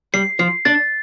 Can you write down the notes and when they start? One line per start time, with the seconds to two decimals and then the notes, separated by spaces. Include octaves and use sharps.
0.14 G3 C7
0.39 F3 C7
0.65 D4 A6